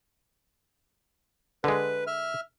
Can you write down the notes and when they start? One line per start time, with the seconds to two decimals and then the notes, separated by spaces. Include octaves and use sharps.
1.64 D3 G#3 B4
2.07 E5 F6